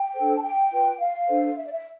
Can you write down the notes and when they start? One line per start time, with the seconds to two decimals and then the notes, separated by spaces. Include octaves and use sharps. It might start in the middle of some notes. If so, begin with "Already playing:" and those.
Already playing: G5
0.14 D4 A4 C5
0.37 A5
0.42 G5
0.71 F4 B4
1.00 F5
1.28 D4 A4 C5
1.56 E5
1.66 D5
1.71 E5